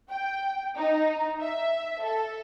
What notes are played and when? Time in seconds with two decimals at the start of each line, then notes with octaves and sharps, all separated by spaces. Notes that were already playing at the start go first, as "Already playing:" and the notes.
0.10 G5
0.77 D#4
1.41 E5
2.04 A4